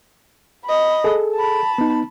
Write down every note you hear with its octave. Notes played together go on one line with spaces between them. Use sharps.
D#5 B5
G#4 A4
A5 B5
B3 D#4